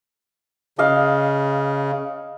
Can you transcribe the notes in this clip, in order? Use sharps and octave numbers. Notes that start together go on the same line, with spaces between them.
C#3 D#5 F5